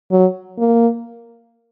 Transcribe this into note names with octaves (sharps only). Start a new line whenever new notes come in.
F#3
A#3